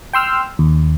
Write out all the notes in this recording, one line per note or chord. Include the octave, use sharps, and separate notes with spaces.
G5 C6 E6 F6
D#2